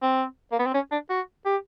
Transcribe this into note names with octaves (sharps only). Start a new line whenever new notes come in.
C4
A#3
B3
C4
C#4
D4
F#4
G4